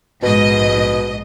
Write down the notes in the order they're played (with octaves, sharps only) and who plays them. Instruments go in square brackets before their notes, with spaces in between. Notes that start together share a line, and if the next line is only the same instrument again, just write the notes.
[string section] A#1 G#2 D#5 [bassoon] B2